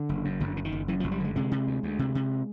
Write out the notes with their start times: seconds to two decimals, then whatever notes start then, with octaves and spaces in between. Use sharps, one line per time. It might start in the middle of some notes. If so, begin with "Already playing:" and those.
Already playing: D3
0.09 F#1
0.25 F#2
0.40 F#1 D3
0.57 D3
0.65 D#3
0.72 F#1
0.88 F#2 E3
1.00 F3
1.03 F#1
1.11 G3
1.20 D3 G#3
1.36 C3 G#3
1.51 C3
1.67 D2
1.83 D2
1.99 C3
2.15 C3